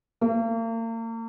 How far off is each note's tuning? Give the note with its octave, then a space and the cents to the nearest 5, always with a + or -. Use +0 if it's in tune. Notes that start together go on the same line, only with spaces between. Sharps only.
A#3 -40